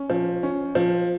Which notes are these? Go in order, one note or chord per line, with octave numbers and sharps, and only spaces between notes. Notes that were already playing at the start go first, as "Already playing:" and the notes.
Already playing: C#4
F3
C#4
F3